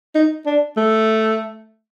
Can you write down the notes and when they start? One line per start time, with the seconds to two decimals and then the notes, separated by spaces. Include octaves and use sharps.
0.15 D#4
0.46 D4
0.77 A3